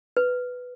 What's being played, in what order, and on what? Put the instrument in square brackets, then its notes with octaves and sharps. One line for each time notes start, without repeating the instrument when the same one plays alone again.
[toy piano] B4